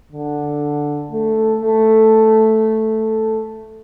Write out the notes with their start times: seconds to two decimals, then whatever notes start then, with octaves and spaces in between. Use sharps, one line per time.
0.12 D3
1.11 A3
1.61 A3